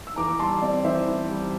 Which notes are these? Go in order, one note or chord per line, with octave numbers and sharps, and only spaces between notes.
E6
E3 A#5 D6
D6
G3 A5 C6
C4 D5
E3 C5 E5
E3
G3